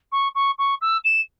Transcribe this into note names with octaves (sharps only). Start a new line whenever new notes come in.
C#6
C#6
C#6
E6
E7